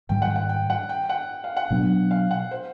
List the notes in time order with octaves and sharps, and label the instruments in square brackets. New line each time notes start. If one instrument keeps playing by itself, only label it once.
[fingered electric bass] G#2 D#3 G3 [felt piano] G5
[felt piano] F#5
F#5
G5
F#5
G5
F#5
F5
F#5
[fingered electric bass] B2 F#3 B3 D4
[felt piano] F5
F#5
C5